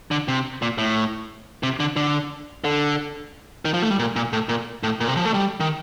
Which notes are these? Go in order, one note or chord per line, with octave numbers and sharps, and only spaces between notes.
D3
C3
A#2
A2
C3
D3
D3
D3
D#3
F3
A3
G3
A#2
A#2
A2
A#2
A2
A#2
C3
F3
A3
G3
D#3